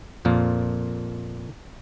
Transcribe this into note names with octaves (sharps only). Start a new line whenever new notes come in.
F2 A#2 F3 A#3